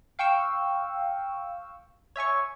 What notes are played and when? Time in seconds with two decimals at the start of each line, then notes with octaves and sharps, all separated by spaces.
0.19 F5 G5 C#6 E6
2.16 C#5 E5 G#5 C#6